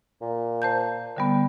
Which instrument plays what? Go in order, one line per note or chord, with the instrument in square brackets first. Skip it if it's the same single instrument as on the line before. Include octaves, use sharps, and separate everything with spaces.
[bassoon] A#2
[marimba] C5 A5 G6
D3 G3 B3